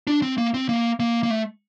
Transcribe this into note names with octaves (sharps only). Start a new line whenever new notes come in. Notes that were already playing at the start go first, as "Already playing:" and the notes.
D4
C4
A#3
C4
A#3
A#3
A#3
A3